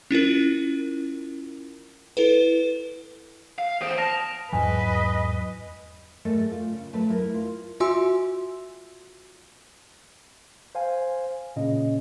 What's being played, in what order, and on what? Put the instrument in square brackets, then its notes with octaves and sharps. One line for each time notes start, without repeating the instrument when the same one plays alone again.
[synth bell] C#4 E4 F4 A#4
E4 A4 B4
[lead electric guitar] F5
[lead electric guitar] E2 C5 [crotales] D#6 D7
[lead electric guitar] A5 [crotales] F6 A#6 F7
[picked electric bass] E2 G#2 F#3 [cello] B4 D#5 [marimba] G#5
[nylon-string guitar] G#2 A3 A4 A#4 D5
F4
C#3
F#3 A3 A4 B4
E4 A#4
F4
[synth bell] F4 F#4 E5 G#5 C6 E6
[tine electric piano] C5 F5 G#5
A#2 C#3 C#4 D#5